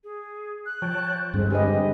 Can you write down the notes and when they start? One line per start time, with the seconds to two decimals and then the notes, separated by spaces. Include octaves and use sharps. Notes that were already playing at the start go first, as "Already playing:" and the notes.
0.04 G#4
0.66 F#6
0.82 F3 C#5 G5 A5
1.34 G2 D3 G#3 C4
1.50 G4 B4 D#5 G#5